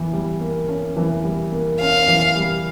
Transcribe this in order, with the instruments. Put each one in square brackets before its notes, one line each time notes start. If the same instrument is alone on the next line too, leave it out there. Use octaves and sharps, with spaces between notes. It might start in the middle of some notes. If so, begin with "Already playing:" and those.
Already playing: [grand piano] E3
G3
A#3
C#4
E3
G3
A#3
[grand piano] C#4 [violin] F5
[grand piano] E3
G3